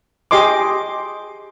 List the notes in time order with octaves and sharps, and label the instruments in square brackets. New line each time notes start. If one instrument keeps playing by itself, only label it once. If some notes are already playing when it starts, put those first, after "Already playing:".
[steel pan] G4 G#4 D#5 C6 D6